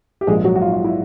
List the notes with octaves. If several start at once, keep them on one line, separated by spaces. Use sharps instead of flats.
G4
A#1 G#2 F3 G#3 A#3 G#4
F#3 F#4
F#4
F4
F4
E4